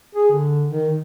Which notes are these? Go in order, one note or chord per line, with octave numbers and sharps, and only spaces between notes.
G#4
D3
D#3